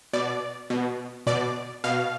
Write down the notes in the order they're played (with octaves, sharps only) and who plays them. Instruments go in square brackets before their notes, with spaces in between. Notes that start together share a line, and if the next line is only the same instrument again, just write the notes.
[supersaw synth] B2 D5
B2
B2 D5
B2 F5